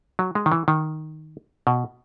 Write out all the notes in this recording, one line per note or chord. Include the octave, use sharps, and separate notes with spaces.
F#3
G#3
D#3
E3
D#3
B2